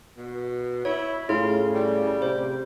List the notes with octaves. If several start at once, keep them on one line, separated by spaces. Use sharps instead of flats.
B2
E4 C#5
A2 C#3 E4 F4
G3
C3 C5